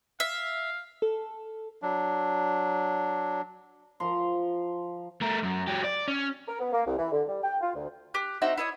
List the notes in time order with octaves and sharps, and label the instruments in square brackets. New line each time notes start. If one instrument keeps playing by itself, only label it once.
[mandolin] E5 [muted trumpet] F5
[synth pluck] A4
[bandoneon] F#3 D4
[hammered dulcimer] F3 A#5 C6
[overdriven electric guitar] A3 A#4
F#2
F#3 G4
D5
C#4
[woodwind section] A#4
B3
A#3
C2
E3
D3
G3
G5
F4
D2
[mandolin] G4 F#6
C4 D#4 F#4 E5
E4 C#5 D#5